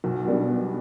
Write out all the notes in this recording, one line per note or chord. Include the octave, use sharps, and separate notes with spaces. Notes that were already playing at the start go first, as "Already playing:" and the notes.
B1
B2 G3 B3 D4